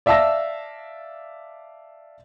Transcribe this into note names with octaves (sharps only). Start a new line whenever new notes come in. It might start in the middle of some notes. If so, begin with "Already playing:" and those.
D5 E5 F5 A5 E6 A#6